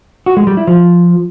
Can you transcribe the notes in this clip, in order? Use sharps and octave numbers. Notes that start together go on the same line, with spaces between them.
F#4
G#3
G3
E4
F3